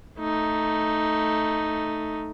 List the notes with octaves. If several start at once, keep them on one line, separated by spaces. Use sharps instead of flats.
A3 D#4